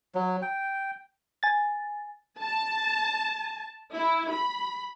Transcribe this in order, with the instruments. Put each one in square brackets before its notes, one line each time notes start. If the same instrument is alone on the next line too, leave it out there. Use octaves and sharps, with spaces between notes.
[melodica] F#3
G5
[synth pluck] G#5 A6
[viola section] A5
E4
B5